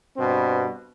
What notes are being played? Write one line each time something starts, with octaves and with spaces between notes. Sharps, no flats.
G2 B2 C4